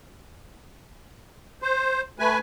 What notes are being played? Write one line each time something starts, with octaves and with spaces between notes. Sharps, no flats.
C5
A3 B4 G#5